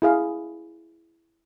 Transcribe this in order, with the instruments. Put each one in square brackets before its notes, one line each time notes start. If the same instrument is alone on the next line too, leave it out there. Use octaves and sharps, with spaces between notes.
[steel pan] E4 G#4 F5